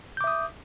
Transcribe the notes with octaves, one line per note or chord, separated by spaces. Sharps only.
E5 D6 D#6 G6